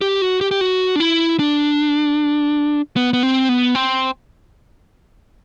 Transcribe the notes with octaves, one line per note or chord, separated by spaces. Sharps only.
G4
F#4
G4
G4
F#4
D4
E4
D4
B3
B3
C4
B3
C4